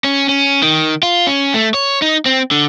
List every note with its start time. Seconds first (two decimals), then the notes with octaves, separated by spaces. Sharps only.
0.04 C#4
0.29 C#4
0.63 D#3
1.03 F4
1.27 C#4
1.54 A3
1.74 C#5
2.02 D#4
2.26 C4
2.51 D3